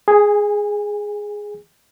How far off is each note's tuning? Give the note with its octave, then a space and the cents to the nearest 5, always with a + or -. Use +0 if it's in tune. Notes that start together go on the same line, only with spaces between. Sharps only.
G#4 +0 G#5 -30